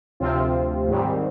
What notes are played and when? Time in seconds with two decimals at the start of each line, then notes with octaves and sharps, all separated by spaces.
0.20 D2 C3 F3 C4 F4
0.88 G#2 D#3 G3 C4